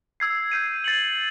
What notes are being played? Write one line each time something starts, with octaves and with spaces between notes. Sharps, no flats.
E6 G#6 C7
E6 G6 C7 D#7
A6 C#7 F#7